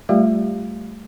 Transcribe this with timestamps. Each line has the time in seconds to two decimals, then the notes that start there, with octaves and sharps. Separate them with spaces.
0.09 G3 A3 F4 G4 D5 F5